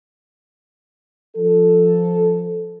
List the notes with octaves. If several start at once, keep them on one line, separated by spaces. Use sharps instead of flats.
F3 A4